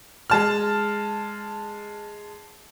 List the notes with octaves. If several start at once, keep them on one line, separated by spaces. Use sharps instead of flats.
G#3 A5 F6